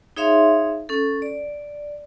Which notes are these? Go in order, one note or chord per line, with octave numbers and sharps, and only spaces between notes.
D#4 G#4 C#5 E5 F5 C6
C#4 A4
D5